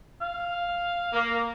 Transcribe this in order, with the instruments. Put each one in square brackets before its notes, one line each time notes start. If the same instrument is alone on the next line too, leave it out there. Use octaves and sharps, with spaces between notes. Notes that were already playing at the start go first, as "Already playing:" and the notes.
[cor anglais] F5
[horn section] A#3